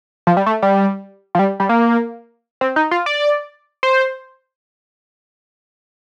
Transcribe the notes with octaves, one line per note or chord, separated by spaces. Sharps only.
F3
G3
A3
G3
F3
G3
G3
A#3
C4
D#4
F4
D5
C5